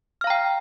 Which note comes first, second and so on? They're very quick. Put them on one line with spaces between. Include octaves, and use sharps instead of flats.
F6 F5 A#5 G5